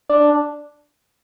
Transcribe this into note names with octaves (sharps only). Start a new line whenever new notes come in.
D4